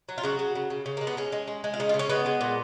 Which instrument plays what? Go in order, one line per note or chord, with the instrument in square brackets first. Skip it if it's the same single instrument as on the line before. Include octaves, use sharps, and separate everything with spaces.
[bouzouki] F#3
F4
C#3 F#4
C#3
C#3
C#3
C#3
A#3
G#3
B3
G#3 C#4
G#3
G#3
G#3
F4
C#3 D#4
F4
C#3
C#4
G#3 B3
G#3
A#2